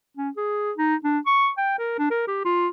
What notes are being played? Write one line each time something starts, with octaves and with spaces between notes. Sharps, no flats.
C#4
G#4
D#4
D4
C#6
G5
A#4
D4
A#4
G4
F4